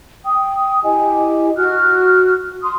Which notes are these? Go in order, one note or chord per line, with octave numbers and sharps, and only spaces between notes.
G5 D#6
E4 G4 D#5 G#5
F#4 F6 F#6
C6 D#6